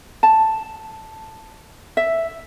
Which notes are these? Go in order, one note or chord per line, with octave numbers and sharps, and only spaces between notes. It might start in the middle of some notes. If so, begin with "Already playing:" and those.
A5
E5